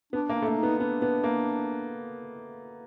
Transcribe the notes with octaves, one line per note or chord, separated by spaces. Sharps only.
B3 D4
A#3
D4
A3
A#3
B3 D#4
B3 D4
B3
A#3